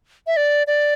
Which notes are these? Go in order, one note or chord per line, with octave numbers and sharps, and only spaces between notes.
E5
D5
D5